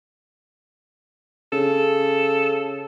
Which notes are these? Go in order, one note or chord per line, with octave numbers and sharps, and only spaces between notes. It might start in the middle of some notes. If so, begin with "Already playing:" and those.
C#3 A4